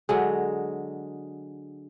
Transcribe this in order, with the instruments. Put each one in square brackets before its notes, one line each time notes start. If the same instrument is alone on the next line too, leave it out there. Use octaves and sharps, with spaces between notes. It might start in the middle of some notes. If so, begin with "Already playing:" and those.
[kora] D3 F#3 G#3